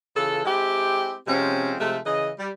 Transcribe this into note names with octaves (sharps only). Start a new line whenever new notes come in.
C#3 E3 F4 A4
G#3 C4 E4 G4
C3 F3 G#3 C4 C#4
C3 F3 G#3 A3
C#3 E3 D#5
G3